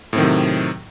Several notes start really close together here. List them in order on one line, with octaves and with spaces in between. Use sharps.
A2 C4 D#3 F#3 C3